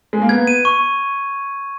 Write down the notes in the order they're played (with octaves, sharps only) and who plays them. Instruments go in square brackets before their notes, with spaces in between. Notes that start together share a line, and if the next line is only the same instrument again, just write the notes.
[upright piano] G#3
A#3
[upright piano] B3 [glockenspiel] G#6
[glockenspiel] D#7
C#6